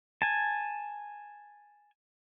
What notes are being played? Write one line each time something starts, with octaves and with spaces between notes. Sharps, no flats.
G#5 A5